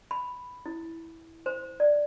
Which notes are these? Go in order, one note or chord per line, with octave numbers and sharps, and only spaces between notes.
B5
E4
C5
D5